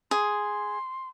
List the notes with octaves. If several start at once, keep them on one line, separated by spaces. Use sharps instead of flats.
G#4 C6